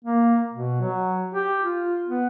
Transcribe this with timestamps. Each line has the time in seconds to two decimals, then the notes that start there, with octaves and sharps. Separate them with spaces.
0.05 A#3
0.53 B2
0.81 F#3
1.35 G4
1.63 F4
2.08 B3